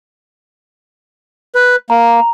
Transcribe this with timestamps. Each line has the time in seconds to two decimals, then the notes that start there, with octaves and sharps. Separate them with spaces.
1.55 B4
1.90 A#3 A#5